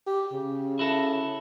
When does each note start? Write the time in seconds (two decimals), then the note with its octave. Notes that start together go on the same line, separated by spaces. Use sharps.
0.07 G4
0.32 C#3
0.79 E4 F#4 A4